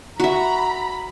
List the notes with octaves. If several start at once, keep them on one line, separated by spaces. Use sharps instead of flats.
F#4 E5 A#5 B5